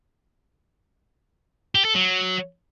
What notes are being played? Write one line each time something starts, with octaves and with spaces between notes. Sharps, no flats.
G4
A4
F#3